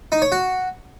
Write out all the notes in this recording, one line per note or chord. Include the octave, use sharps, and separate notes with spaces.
D#4
C#5
F#4